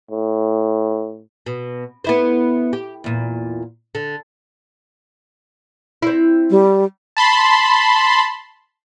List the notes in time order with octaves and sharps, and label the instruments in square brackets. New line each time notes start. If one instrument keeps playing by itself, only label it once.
[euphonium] A2
[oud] B2
B3 E4 C5
G4
E2 A#2
D3
C4 E4
[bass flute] G3
[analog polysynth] A5 B5 C6